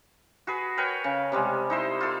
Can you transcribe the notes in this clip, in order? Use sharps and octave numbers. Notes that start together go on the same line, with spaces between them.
F#4 G#4 B4
A#4 B4 C#5 G5
C#3
C3 G3 G#3
D#4 E4 C5
F4 A4